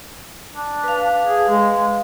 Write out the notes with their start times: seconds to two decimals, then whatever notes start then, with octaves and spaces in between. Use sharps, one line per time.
0.53 D4
0.84 B4 F5
1.26 G#4
1.48 G#3
1.79 G#3